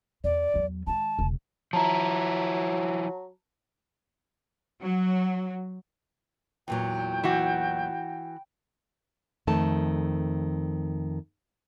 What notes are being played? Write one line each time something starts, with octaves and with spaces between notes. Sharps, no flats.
E2 D5
E2 F#3
D#3 G#3 A5
E1 C#3
F3 F#3 E4 A5 A#5
F#3
E2 A#2 F#3 G5
E3 F#4
F2 D#3 A3 A5